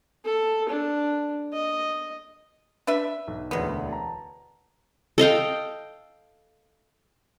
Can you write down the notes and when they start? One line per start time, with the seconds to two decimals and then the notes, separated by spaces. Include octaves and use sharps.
0.24 A4
0.69 D4
1.53 D#5
2.87 D4 B4 E5
3.28 B1
3.51 E1 D2 F#3 B3
3.88 A5 A#5
5.18 A4 D#5 F5 G5